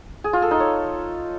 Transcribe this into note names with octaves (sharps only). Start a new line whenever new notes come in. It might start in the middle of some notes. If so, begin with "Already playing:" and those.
G#4
F4
A4
D#4
C#5